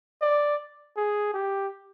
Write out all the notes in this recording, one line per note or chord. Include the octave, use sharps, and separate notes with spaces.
D5
G#4
G4